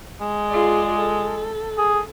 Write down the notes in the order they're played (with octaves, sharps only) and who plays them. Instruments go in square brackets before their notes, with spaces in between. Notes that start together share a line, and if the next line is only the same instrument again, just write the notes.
[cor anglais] G#3
[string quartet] F4 G#4 D5
A4
[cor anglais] G#4